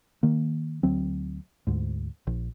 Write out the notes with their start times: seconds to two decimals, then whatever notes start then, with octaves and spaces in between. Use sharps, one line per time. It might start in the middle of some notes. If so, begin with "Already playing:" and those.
0.23 D#3 A#3
0.83 D2 F#3 C4
1.67 D2 G#2
2.27 A#1